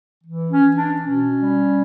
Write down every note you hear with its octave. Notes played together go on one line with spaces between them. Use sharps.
E3
C#4
E3
D4
B2 C#4
G3